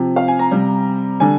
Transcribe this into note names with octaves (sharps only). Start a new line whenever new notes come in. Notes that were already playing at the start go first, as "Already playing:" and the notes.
Already playing: C3 F3
F5
G#5
A#5
C3 G3
D3 G3 G#5